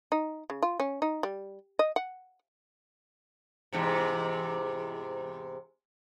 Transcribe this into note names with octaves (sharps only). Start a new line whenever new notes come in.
D#4
C#3
F4
C#4
D#4
G3
D#5
F#5
E2 G#2 C3